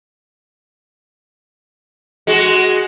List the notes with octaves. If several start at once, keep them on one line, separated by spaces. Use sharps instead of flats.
G#3 F#4